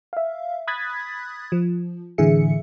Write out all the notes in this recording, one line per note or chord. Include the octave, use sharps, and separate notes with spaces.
E5 F5
B5 D#6 F#6 G#6 A6 B6
F3
A2 D3 E3 G#4 E5 C#7